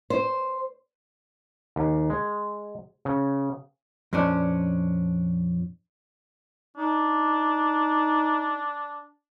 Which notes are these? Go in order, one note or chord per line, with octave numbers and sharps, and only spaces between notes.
C5
D#2
G#3
C#3
F2 A#2 C#4 D4
D4 D#4